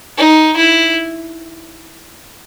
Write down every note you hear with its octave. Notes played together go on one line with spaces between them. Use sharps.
D#4
E4